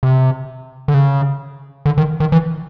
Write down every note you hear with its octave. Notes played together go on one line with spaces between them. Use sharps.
C3
D3
C#3
D3
D#3
D#3
E3